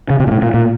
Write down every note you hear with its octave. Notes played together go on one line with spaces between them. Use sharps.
C#3
C3
A#2
A2
A#2
A#2